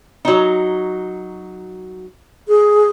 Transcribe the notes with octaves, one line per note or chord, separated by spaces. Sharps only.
F#3 D#4
G#4